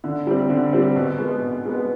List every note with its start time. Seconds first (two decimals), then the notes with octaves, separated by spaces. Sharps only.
0.04 D3
0.27 G3 C4
0.50 D3
0.73 G3 C4
0.96 B2
1.18 G#3 B3
1.42 B2
1.65 G#3 B3